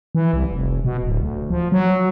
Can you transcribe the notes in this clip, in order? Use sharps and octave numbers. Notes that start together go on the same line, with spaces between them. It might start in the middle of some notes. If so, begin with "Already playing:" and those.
E3
C2
F1
B2
D1
D2
F3
F#3